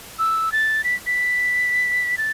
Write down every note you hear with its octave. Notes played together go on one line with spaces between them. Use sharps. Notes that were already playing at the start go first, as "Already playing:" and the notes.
E6
A6
B6
B6
A6